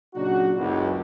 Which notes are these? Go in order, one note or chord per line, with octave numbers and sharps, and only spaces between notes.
A#2 C#3 F#3 D4 D#4 F#4
F#1 C#2